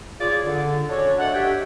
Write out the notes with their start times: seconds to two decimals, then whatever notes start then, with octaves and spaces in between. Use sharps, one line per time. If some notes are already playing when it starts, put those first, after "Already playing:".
0.20 F4 G#4 C#5 D5
0.46 D3
0.90 C#4 D4 F#4 A4 C#5
1.19 A3 D4 A4 D#5 F#5
1.34 G4 C#5 E5 G5